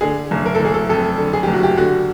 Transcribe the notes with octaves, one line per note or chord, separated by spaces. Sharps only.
D3 G#4
F#1
A#4
A4
F#1
G#4
A4
F2 A4
D3
G#4
F#1 G4
F#4
G4
D3 F#4